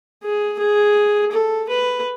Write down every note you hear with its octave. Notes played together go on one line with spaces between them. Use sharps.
G#4
G#4
A4
B4